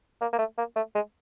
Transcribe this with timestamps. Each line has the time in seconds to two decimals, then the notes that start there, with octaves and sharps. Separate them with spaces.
0.21 A#3
0.33 A#3
0.39 A3
0.58 A#3
0.76 A3
0.95 G#3